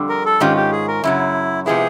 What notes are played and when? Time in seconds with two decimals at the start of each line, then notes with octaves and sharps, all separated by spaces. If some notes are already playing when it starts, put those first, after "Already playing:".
Already playing: F2 D3 G3
0.09 A#4
0.26 A4
0.40 G#2 D#3 G#3 C#4 F4 G4
0.56 G4
0.72 G#4
0.88 A#4
1.04 F#2 C#3 F#3 E4
1.66 C3 F3 G#3 B3 E4 G#4